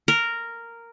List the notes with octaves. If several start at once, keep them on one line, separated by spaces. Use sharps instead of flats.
A#4